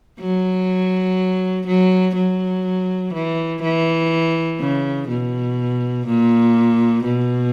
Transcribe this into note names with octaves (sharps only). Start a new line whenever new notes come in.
F#3
F#3
F#3
E3
E3
C#3
B2
A#2
B2